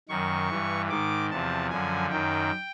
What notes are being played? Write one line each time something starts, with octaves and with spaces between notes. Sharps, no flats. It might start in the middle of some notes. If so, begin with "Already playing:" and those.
F#2 D#3 C#6
G2 E3
G#2 D#3 D6
E2 C3 F3 A5
F#2 D3 F3 G#5
F#2 D#3 G5